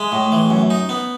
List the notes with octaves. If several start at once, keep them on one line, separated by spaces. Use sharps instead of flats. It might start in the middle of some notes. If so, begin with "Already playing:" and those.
Already playing: G#3 E5 G#5
A2
E3
F#2
D#4
B3